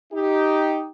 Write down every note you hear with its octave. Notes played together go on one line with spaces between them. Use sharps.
D#4 G4